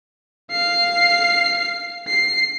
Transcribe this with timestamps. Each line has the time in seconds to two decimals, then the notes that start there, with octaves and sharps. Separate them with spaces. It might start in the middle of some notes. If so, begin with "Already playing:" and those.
0.51 F5 C7
2.08 C7